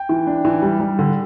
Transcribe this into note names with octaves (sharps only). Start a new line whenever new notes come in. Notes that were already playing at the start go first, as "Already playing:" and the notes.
Already playing: G5
E3
D4
E3
G3
G3
D3